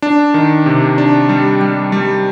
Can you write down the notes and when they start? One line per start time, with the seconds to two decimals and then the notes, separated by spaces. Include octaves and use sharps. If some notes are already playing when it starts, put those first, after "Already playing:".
0.02 D4
0.34 D#3
0.66 C3
0.98 D4
1.29 G3
1.61 G3
1.92 G3